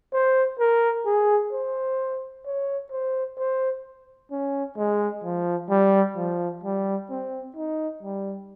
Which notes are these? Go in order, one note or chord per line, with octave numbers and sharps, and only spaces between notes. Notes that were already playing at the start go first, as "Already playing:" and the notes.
C5
A#4
G#4
C5
C#5
C5
C5
C#4
G#3
F3
G3
F3
G3
C4
D#4
G3